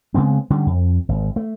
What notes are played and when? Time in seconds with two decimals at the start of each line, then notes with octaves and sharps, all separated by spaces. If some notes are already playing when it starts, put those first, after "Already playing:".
0.14 C#3 G#3 B3 C4
0.50 D3 G3 C#4
0.66 F2
1.09 G#1
1.36 A3